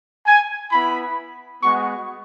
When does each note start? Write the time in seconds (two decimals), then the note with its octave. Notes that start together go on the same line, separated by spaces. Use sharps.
0.27 G#5
0.72 B3 E4 B5
1.63 G#3 B3 F#4 C#6